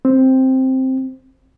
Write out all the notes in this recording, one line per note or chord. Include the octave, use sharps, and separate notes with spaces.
C4